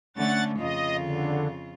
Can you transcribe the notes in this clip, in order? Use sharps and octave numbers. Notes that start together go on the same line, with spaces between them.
D3 A3 C#4 F#5 A6
F2 C#3 F4 D#5
D3